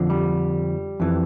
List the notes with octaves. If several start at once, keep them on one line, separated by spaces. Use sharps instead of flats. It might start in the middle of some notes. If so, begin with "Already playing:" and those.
Already playing: F2 D3 F3
G3
F2 E3